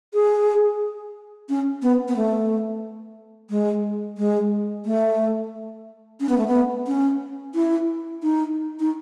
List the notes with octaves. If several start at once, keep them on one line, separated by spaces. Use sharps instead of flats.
G#4
C#4
B3
B3
A3
G#3
G#3
A3
C#4
B3
A3
B3
C#4
E4
D#4
D#4